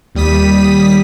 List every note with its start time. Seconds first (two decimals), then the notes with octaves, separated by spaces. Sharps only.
0.15 D#2 G3 D#6 B6